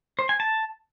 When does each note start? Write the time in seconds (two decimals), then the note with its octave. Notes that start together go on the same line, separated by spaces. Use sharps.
0.19 C5
0.29 G#5
0.40 A5